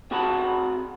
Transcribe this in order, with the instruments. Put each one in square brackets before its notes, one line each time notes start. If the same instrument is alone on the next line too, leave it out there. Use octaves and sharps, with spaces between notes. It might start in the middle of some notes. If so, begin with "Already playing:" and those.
[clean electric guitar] C4 F#4 G#4 F#5 A5 B5